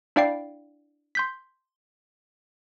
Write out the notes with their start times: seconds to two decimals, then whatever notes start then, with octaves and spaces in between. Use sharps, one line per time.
0.16 D4 E4 D5 F5 G5 C7
1.15 C6 G6 B6